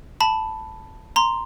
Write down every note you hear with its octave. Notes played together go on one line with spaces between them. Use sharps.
A5 B5
A#5 C6